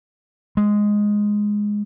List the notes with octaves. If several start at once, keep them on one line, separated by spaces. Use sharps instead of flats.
G#3